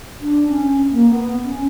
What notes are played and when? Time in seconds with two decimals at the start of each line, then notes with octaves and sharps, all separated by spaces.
0.21 D4
0.49 C#4
0.92 A#3
1.10 B3
1.44 C#4